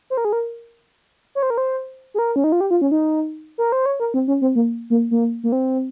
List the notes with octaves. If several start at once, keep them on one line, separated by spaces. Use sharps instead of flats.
C5
A#4
G#4
A#4
C#5
C5
A#4
C5
G#4
A#4
C#4
D#4
F4
G4
F4
C#4
D#4
A#4
C5
C#5
A#4
C4
C#4
C4
A#3
A#3
A#3
A#3
C4